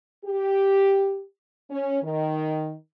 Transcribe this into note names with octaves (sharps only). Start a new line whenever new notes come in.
G4
C#4
D#3